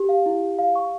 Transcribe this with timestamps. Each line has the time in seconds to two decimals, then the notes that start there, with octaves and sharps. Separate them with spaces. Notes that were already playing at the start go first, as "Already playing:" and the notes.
Already playing: G4
0.09 F5
0.26 E4
0.43 G4
0.59 F5
0.75 C#6